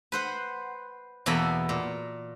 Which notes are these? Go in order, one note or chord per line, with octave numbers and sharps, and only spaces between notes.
B4 C5 F#5
E2 B2 A#3 A4 B5
A#2